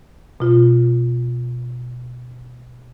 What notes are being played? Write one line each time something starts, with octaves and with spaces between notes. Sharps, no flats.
B2 F4